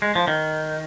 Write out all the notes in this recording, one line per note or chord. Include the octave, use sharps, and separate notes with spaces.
G#3
F3
D#3